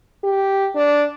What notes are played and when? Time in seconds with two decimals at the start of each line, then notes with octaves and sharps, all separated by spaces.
0.24 G4
0.75 D4